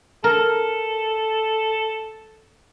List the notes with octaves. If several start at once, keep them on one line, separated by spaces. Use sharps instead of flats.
A4 A#4